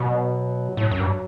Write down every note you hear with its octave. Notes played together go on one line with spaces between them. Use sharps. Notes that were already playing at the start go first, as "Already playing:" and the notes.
Already playing: B2 F#3
A2
F#2
G2